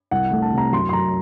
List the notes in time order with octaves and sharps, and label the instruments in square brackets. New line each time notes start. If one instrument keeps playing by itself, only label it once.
[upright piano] C2 F#5
A3
A5
C3 A#5
F#2 C6
C6
F#2 A#5